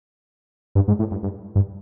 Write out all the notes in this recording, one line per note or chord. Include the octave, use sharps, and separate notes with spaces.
G2
G#2
A2
G2
G2
G2